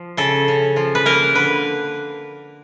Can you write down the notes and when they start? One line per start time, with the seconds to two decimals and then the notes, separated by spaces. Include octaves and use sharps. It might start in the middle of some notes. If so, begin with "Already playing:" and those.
Already playing: F3
0.17 C#3 A4
0.48 C#3
0.76 F3
0.95 B4
1.05 A#3 A#4
1.35 D3 B4